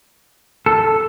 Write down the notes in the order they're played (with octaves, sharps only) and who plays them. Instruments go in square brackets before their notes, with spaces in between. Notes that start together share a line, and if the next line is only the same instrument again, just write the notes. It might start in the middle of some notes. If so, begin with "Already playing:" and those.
[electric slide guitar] A4